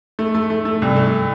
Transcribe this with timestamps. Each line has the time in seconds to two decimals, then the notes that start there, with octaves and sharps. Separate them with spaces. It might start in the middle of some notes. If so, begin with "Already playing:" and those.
0.19 A3
0.35 A3
0.50 A3
0.65 A3
0.82 C2
0.96 A3